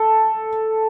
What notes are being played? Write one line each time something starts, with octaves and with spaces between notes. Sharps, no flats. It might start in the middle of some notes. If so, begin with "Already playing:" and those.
Already playing: A4